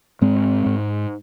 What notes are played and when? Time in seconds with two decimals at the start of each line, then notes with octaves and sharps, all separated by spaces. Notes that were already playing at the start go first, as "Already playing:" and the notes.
0.21 G#2 G#3 C4
0.66 G#2